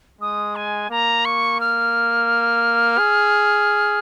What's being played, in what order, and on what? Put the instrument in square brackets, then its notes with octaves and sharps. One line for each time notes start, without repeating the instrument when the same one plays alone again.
[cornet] G#3 [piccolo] D#6
[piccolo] G#5
[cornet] A#3 [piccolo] A#5
[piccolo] C#6
F6
[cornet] G#4